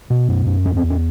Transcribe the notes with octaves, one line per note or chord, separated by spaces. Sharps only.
B2
F#2
F#2
E2 C#4
C4
E2
C#4